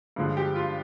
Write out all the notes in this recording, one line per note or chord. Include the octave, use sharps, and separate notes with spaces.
G2 D3 F3 G#3
G4
F4